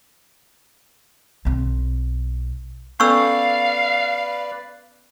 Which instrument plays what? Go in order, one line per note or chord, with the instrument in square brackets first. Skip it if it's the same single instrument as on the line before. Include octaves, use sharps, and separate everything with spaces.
[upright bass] B1 C4
[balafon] B3 C#4 A4 [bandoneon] B4 D5 [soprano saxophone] F5 [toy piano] C#6 E6